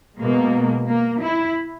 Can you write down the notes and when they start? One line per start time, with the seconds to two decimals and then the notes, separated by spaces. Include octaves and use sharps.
0.18 B2 G#3 A#3
0.88 A#3
1.22 E4